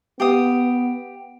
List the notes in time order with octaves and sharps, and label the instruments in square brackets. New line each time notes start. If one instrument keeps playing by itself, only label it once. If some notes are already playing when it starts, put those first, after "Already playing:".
[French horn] B3 [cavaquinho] G4 F5 D#6